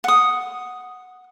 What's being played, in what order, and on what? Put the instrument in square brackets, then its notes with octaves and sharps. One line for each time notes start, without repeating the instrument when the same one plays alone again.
[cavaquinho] F#5 D#6